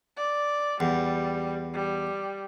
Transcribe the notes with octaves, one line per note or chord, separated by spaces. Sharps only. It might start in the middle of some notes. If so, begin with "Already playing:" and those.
D5
E2 G3
G3